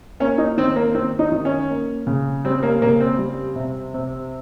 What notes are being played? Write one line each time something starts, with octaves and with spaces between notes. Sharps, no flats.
A#3 C#4
D#4
D#3 C4
A#3
D#3 C4
D#4
D#3
C#4
A#3
C#3
G3 C4
A#3
C#3 A#3
C4
G3
C3
C3